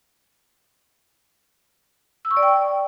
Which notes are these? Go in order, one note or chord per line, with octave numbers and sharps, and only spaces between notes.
E6
C#6
D5
G5